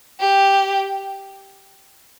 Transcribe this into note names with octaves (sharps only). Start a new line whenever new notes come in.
G4